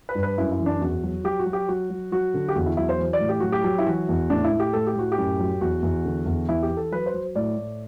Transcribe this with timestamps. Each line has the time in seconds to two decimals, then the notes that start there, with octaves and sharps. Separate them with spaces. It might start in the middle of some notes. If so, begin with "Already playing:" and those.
0.09 B4
0.15 G2
0.23 B4
0.38 F#2 E4
0.52 E4
0.59 E3
0.66 D4
0.81 E2 F#4
1.03 F#3
1.24 F#3 G4
1.39 F#4
1.46 F#3
1.53 G4
1.68 F#3 F#4
1.90 F#3
2.12 F#3 F#4
2.34 D3
2.48 G4
2.55 E2 F#4
2.66 E4
2.77 F#3 E4
2.89 C5
3.00 E3
3.13 D5
3.20 A2
3.29 G4
3.40 F#3 F#4
3.52 G4
3.64 F#3
3.78 E4
3.86 E3 F#4
4.09 E2
4.30 A2 D4
4.44 E4
4.52 A2
4.60 G4
4.73 A2 A4
4.87 G4
4.96 A2 F#4
5.12 G4
5.18 F#2
5.40 F#3
5.61 E2 F#4
5.83 E2
6.05 D3
6.26 E2
6.48 E3 E4
6.63 G4
6.71 E3
6.77 A4
6.92 F#3 B4
7.06 C5
7.14 F#3
7.35 A2 D5
7.57 A2